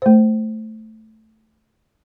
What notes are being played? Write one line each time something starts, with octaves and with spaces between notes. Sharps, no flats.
A3 C5